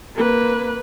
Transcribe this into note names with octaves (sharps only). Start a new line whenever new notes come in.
A#3 B4